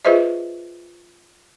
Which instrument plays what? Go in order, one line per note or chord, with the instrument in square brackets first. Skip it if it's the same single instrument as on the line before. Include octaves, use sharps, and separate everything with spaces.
[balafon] F4 G#4 B4 C5 D#5 E5